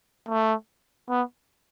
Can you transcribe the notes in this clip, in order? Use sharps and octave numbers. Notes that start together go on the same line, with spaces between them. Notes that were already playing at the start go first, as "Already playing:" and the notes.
A3
B3